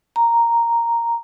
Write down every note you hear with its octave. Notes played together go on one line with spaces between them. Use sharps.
A#5